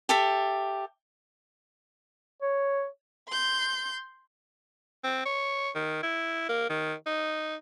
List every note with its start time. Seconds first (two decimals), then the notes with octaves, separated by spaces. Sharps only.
0.09 G4 A4 E5
2.42 C#5
3.29 C6 G6
5.04 C4
5.26 C#5
5.75 D#3
6.03 E4
6.49 A#3
6.70 D#3
7.06 D#4